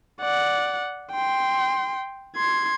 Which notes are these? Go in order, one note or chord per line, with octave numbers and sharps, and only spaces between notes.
D5 F#5
G5 C6
C6 G#6